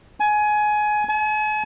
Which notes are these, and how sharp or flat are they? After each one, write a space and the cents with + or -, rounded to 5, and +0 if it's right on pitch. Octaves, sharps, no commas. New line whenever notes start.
G#5 +20
G#5 +45